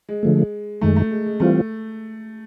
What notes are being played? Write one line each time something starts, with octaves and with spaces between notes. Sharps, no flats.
G#3
D3 F3 A3
F#2 D#3 G#3 A3
A3
G#3
G#3
E3 G3 A3 C4 F4